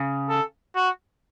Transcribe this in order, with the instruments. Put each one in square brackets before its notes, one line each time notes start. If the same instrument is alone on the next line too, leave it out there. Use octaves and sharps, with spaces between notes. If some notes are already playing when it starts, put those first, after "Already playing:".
Already playing: [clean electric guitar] C#3
[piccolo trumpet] A4
F#4